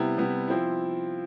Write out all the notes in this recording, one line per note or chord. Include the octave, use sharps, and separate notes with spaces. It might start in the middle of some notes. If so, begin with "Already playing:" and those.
Already playing: C3 G3 B3 E4
C3 G3 B3 E4
F3 C4 E4